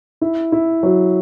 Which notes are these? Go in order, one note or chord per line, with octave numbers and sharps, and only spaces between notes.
E4
E4
F#3